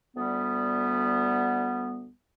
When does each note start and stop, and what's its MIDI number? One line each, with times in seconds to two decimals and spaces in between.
0.16 2.11 38
0.16 2.11 55
0.16 2.11 59